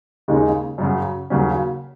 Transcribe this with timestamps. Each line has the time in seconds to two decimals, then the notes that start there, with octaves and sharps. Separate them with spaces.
0.28 D#2 C#3 G#3 D#4
0.78 F#2 C#3 F#3
1.30 D#2 C#3 F#3 C#4